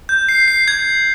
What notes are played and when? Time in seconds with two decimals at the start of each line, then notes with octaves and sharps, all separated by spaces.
0.09 G6
0.29 C7
0.48 C7
0.68 G#6